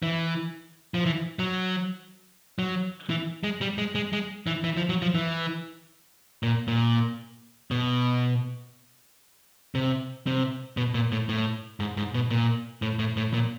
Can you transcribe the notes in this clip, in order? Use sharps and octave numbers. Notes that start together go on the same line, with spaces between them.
E3
F3
E3
F#3
F#3
E3
G#3
G3
G#3
G#3
G#3
E3
E3
F3
F#3
F3
E3
A#2
A#2
B2
C3
C3
B2
A#2
A2
A2
G#2
G#2
B2
A#2
A2
A2
A2
A#2